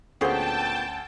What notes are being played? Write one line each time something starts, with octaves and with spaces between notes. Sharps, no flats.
D2 A#2 B3 C#4 G#4 C5 G5 A5